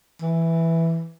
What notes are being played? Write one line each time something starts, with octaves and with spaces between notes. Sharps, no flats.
E3